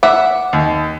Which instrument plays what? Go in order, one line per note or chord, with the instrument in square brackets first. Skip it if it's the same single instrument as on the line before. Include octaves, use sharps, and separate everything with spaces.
[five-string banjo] E5 F#5 [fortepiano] D6
[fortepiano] D#2